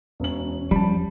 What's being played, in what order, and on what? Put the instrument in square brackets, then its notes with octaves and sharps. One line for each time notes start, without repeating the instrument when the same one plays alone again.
[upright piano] E1 F#7 [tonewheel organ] E2 C#4
[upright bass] F3 [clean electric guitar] G3 [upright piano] A5 B5